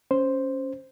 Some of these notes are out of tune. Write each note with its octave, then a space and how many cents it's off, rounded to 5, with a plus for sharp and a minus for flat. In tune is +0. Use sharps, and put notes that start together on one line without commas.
C#4 +0 C5 +0